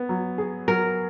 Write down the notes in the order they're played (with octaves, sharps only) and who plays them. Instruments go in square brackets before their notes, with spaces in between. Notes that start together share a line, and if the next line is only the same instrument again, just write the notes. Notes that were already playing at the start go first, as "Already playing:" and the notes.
Already playing: [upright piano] B3
F#3
G#4
[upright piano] F#3 [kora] A#4